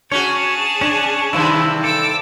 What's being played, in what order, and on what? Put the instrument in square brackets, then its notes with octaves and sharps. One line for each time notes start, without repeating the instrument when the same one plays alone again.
[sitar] C#4 F#4 [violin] G#4 A5 [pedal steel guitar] C#5
[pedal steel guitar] C#4 C#5 [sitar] D4
[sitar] G2 C3 D#3 [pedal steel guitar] E4
[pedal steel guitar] A4 [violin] D6 E6